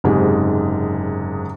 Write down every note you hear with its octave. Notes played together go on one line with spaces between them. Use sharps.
F#1 G#2 C3 G#4